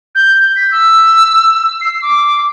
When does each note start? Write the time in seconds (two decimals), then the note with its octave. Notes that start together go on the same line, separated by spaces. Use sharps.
0.15 G6
0.56 B6
0.71 E6
1.81 C7
2.02 D6